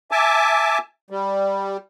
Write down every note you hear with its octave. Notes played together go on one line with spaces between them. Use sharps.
E5 G#5 A5 D6
G3